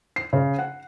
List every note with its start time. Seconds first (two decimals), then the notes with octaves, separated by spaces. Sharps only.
0.16 C7
0.33 C#3
0.59 F#5